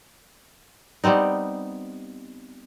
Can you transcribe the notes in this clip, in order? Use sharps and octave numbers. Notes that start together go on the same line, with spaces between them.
G3 B3 C4 D#4